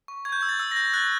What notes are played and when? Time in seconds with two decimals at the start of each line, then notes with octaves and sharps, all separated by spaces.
0.08 C#6
0.25 C#6 G#6
0.32 G6
0.41 E6 G#6
0.49 A6
0.59 E6
0.71 G6 A#6
0.94 F#6 A6